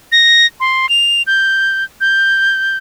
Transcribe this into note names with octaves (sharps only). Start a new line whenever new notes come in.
A#6
C6
F7
G6
G6